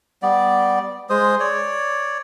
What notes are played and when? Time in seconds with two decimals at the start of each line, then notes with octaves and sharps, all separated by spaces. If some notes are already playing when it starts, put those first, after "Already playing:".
0.22 G3 B3 D5
1.10 G#3 C5 D#6
1.40 C#5 D5